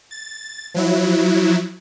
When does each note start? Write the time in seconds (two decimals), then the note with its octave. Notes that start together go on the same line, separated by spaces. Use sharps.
0.11 A6
0.74 F3 F#3 E4